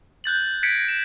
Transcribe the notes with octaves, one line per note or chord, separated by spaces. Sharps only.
F#6 G6 A6 F#7
G#6 A#6 B6 C#7 D7
E7